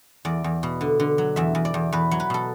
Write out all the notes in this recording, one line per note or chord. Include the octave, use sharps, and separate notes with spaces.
E2 D5
E2
B2
D3
D3
F#3
E2 E5
E2
D5
E2
E2 B4
F#3
B4
B2 A4